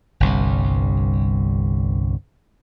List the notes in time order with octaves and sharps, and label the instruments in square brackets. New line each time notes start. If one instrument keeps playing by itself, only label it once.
[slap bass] G1 C2 G2